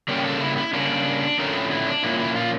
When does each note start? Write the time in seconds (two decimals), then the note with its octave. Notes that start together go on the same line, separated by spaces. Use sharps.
0.08 C#3 G3 A#3 C#4 G4
0.24 A4
0.40 E4
0.57 E4
0.73 C#3 G3 A#3 C#4 D4
1.38 F2 D3 A3 C#4 A#4
1.54 E4
1.71 E4
1.86 D4
2.03 A#2 F3 A#3 C#4 E4
2.19 E4
2.36 F4